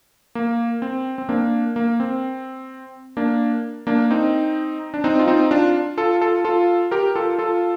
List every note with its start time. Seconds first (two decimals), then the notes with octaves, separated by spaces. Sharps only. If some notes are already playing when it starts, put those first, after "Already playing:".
0.35 A#3
0.82 C4
1.18 C4
1.29 A#3 D4
1.76 A#3
2.00 C4
3.17 A#3 D4
3.87 A#3 D4
4.11 C4 D#4
4.94 D4
5.04 C4 D#4
5.19 F4
5.28 C4 D#4
5.51 D4 F4
5.97 F4 A4
6.21 F4 A4
6.45 F4 A4
6.91 G4 A#4
7.16 F4 A4
7.39 F4 A4